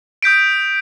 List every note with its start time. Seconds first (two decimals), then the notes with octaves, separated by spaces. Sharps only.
0.22 D#6 G6 B6 D7